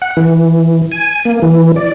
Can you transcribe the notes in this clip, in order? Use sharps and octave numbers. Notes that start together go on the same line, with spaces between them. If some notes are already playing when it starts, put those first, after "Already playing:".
F#5
E3
G#5
A#3
E3
D5